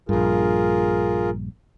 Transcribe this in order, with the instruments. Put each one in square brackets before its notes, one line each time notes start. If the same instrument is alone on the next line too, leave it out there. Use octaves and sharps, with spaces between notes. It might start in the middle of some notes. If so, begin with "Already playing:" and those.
[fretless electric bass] A#1 G2 [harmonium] F4 G#4 A#4